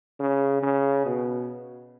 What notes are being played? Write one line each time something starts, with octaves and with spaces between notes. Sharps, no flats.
C#3
C#3
B2